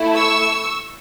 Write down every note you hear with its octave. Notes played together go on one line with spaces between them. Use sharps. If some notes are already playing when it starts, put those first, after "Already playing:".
Already playing: A3 E4 A4
C#6 E6